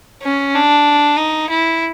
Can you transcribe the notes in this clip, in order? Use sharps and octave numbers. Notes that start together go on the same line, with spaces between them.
C#4
D4
D#4
E4